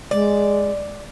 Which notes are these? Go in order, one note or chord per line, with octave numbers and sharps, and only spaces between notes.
G#3 D5